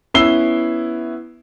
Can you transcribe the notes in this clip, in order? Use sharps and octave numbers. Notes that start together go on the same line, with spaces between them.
B3 C#4 E4 E6 C7 G7